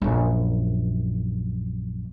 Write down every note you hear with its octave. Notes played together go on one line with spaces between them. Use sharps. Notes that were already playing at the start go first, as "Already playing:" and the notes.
A#1 F#2